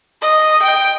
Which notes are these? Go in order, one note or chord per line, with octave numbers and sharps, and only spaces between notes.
D#5
G5